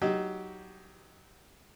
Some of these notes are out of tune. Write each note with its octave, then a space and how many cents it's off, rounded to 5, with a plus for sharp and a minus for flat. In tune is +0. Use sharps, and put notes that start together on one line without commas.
F#3 +15 D#4 +0 G4 +0